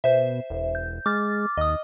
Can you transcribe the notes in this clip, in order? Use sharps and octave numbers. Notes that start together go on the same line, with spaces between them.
B2 C5 E5
E1
G6
G#3 D6 F6 A6
D#2 D#5 D#6